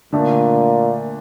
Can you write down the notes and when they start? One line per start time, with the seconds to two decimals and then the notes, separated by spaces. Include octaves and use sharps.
0.13 A#2 D3 A3 D4